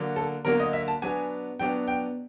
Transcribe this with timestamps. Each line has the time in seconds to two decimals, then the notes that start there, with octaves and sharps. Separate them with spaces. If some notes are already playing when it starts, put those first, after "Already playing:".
Already playing: D3 F#3 A#3
0.16 A4
0.45 D3 F#3 A#3 A#4
0.60 D#5
0.73 E5
0.88 A5
1.02 B2 F#3 B3 D4 G#5
1.59 B2 F#3 B3 D4 G5
1.88 G5